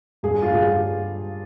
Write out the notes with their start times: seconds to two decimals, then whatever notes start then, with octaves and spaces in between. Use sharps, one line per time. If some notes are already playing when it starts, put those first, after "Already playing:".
0.23 G2 G#4
0.42 F4
0.52 G2 G#4
0.61 G4